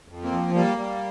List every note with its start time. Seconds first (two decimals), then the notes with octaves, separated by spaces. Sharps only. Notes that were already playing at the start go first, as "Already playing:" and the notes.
0.08 F2
0.23 A#3 C4
0.32 F3
0.54 G3 A#3
0.78 G3